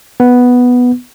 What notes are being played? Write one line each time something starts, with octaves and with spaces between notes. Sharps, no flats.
B3